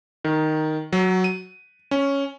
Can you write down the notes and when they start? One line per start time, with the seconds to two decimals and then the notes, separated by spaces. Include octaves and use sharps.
0.24 D#3
0.93 F#3
1.24 D#7
1.91 C#4